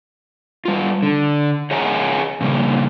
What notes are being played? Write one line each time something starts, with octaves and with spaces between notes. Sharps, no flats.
G3 F4
D3
G#4 C#5 D#5 F#5 G#5 A#5
A#2 C#3 G3 A#3